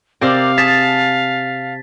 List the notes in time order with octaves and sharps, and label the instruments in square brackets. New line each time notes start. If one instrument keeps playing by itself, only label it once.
[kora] C3 G5 [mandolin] A#4 C5 D5 [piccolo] F5
[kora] G#4 [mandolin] A5 [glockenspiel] A6 B6